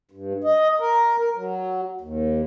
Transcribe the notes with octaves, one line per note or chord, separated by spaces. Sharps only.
G2
D#5
A#4
A#4
F#3
D#2